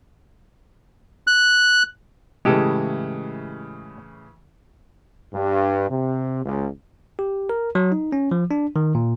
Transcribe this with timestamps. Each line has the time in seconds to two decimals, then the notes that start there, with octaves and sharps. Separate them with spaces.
1.27 F#6
2.45 A2 C#3 E3 G#3 G4 A4
5.34 G2
5.90 C3
6.46 C#2
7.19 G4
7.49 A#4
7.75 F#3
7.92 D#4
8.12 C#4
8.31 F3
8.51 D4
8.76 D#3
8.95 A#2